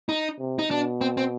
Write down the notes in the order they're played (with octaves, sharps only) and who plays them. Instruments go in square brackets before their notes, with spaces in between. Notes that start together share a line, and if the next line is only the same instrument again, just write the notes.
[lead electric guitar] D#4
[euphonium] C3
[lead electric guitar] D#4
[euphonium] B2 [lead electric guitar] D4
[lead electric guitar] C4
C4